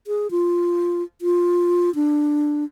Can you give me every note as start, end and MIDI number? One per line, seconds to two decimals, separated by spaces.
0.07 0.31 68
0.31 1.03 65
1.22 1.93 65
1.95 2.64 62